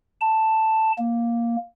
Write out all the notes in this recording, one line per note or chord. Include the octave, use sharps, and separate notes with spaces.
A5
A#3